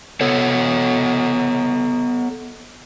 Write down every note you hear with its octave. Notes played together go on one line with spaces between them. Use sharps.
B3 A4 C#5